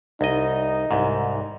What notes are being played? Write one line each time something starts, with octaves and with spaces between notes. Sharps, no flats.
C2 D#4 D#5
C2 G#2